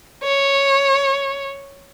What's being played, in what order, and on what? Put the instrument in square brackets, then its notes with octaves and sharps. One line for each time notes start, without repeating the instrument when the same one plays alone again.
[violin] C#5